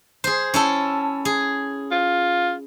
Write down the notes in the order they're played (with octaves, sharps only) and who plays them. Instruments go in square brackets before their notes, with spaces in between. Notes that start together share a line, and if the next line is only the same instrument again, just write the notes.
[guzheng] G#4 C5
C#4 E4 A4
G#4
[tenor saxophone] F4